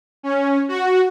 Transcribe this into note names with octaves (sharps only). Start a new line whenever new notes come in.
C#4
F#4